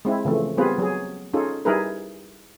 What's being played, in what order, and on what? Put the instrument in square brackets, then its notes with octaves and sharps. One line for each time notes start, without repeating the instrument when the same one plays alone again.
[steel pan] G#3 C4 E4
C#3 E3 F3 A3
G3 B3 C4 F4 G#4 B4
F#3 G#4
C#4 D#4 F4 G#4 A4
G3 D#4 E4 G#4 A#4 B4